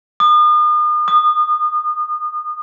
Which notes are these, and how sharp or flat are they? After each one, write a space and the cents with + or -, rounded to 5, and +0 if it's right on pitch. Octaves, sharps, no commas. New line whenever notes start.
D#6 -40
D#6 -30